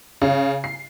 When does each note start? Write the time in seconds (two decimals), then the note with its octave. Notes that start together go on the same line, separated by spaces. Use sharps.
0.22 C#3
0.64 C7